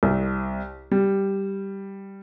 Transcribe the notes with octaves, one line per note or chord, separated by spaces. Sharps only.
C2
G3